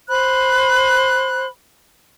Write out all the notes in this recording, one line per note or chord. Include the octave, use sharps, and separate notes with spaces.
C5 B5 F#6